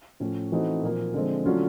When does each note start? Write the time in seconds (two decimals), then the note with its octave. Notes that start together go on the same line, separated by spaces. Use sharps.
0.20 A2 F3 A3 C#4
0.52 E3 A3 C4 D#4 F#4
0.83 A#2 F3 A#3
1.14 D3 F3 G#3 C4
1.46 D3 F#3 A3 C#4 F4